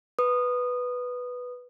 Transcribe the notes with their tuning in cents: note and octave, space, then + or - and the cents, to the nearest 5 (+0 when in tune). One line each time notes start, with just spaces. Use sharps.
B4 +0 D#6 -15